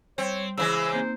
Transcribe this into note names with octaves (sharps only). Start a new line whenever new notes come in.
G3 C4 C#5 C6
C#3 E3 G#3 C5 E6
A#3 C4 D#4 C5